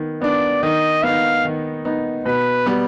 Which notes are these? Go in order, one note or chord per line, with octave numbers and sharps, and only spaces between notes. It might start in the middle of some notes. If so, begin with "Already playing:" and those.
Already playing: D#3 B3
B3 D4 D5
D#3 D#5
B3 D#4 F5
D#3
B3 D#4
B2 B4
G3 B3